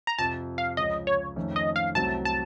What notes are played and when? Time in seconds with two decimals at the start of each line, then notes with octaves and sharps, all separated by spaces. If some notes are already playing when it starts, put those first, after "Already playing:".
0.07 A#5
0.19 F2 C3 F3 A5
0.58 F5
0.77 C#2 C#3 F3 D#5
1.07 C#5
1.36 F2 D#3 A3 C#4
1.56 D#5
1.76 F5
1.95 C2 C3 F#3 A3 C4 A5
2.25 A5